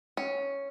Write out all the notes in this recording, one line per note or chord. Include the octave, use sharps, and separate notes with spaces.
C#4